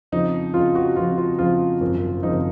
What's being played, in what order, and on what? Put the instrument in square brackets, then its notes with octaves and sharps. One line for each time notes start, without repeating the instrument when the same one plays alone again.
[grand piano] F2 C#3 F3 D#4
F2 C#3 F3 F4
F#4
F2 C#3 F3 F4
F4
F2 C#3 F3 F4
G#1 F#2 C#3 F3
G#1 F#2 C#3 F3 D#4